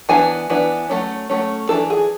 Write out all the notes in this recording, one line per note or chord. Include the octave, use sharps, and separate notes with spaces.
E3 B3 D4 G#5
E3 B3 D4
F#3 A3 C#4
F#3 A3 C#4
E3 G#3 D4 A4
G#4